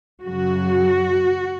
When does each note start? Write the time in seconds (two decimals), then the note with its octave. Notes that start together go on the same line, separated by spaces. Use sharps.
0.23 F#2 C#3 F#3 F#4